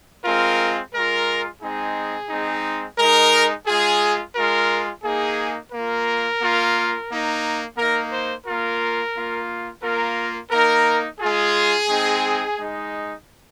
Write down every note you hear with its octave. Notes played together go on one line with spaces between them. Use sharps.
G#3 C4 F4 A#4
G#3 F4 A#4
G#3 C4 D#4 G#4
G#3 C4 D#4
G#3 D#4 A#4
G#3 F4 G#4
G#3 F4 A#4
A#3 D#4 G#4
A#3 F4 A#4
A#3 F4
A#3 D#4
A#3 D#4 A#4
C5
A#3 F4 A#4
A#3 F4
A#3 F4 A#4
A#3 D#4 A#4
G#3 F4 G#4
G#3 C4 D#4
G#3 D#4